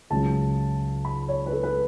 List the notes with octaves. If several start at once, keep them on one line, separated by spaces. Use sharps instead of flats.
C#2 C#3 F#3 A5
B5
C#5
B4
A4
B4